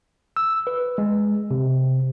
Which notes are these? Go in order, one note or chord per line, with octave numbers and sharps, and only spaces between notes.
E6
B4
G#3
C3